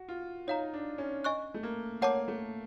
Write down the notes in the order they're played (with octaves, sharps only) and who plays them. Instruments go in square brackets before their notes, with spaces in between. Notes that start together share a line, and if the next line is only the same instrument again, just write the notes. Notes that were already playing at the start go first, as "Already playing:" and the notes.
Already playing: [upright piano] F#4
F4
[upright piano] D#4 [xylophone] C#5 F5 A#5
[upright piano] D4
C#4
[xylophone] D#5 G#5 C#6 F#6
[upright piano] A3
A#3
[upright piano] A#3 [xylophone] C#5 F#5 A5 D6
[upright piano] A3